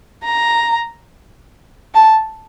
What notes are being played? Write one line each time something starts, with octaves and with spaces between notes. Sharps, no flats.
A#5
A5